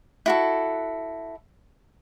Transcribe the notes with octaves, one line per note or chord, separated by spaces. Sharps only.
E4 F#4 A4